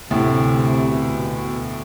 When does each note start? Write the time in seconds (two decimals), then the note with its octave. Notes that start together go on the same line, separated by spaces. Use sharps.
0.10 D2 A2 C3
0.88 B2